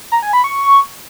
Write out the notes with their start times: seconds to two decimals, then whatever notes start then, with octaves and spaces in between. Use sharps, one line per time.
0.12 A#5
0.23 G#5
0.33 B5
0.44 C#6